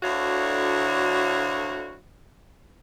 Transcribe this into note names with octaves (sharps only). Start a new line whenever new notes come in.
D2 D3 E4 F#4 C#5 F5